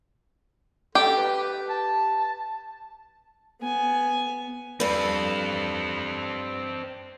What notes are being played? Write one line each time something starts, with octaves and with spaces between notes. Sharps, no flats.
G4 A4
B4
A5
B3 G#5
G2 C4 A4 B4